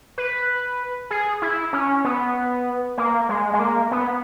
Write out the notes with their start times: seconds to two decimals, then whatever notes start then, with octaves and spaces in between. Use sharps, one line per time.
0.18 B4
1.11 G#4
1.42 E4
1.73 C#4
2.05 B3
2.98 A#3
3.29 G#3
3.53 G#3
3.59 A#3
3.91 B3